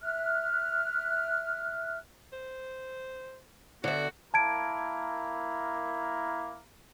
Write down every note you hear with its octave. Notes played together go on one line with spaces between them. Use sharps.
E5 F6 F#6
C5
D3 B3 F#4 E5
A#3 E4 A#4 A5 G#6 D7